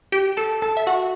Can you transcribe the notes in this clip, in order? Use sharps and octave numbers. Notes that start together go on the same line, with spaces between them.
G4 G5
A4 A5
A4 A5
E5
F#4 F#5